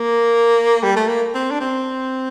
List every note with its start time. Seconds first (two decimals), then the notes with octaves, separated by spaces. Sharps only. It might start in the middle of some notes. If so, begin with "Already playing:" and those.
Already playing: A#3
0.83 G3
0.96 A3
1.08 A#3
1.35 C4
1.51 D4
1.61 C4